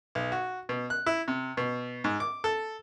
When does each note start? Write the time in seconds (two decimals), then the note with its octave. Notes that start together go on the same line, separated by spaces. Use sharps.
0.15 B1
0.32 F#4
0.69 B2
0.90 F#6
1.06 E4
1.28 C3
1.57 B2
2.04 G#2
2.20 D6
2.44 A4